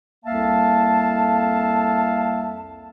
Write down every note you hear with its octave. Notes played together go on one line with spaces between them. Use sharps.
C2 F2 A#3 E5 F5 A5